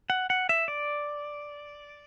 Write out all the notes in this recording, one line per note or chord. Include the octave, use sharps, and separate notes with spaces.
F#5
F#5
E5
D5